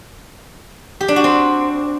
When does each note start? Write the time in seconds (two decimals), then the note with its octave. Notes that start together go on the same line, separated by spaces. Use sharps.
1.01 G4
1.08 D4
1.16 F#4
1.24 C4